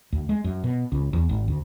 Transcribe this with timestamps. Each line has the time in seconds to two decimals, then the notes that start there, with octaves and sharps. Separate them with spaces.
0.12 D2
0.29 G#3
0.44 F#2
0.64 B2
0.92 C#2
1.13 E2
1.29 G#1
1.48 D2